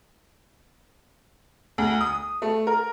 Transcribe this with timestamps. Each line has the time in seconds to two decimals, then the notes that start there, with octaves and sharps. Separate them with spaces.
1.78 D2
2.01 D#6
2.42 A3
2.67 A#4